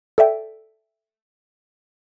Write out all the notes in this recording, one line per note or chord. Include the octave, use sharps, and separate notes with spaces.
A4 D5 E5 G5